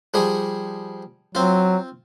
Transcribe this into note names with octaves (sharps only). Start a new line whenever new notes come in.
F3 G3 G#4
F#3 C4 F4